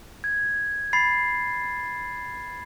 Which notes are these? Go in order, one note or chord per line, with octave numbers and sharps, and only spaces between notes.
G#6
B5 A6 C7